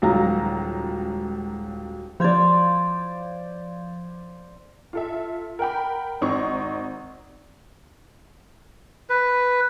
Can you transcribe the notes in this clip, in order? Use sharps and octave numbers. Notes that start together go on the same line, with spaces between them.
D#1 C#2 F#3 F5 A#5
F3 C5 D5 F5 G#6
F4 A4 E5
A#4 F#5 G5 B5
G#1 C4 D#4 C6 C#6
B4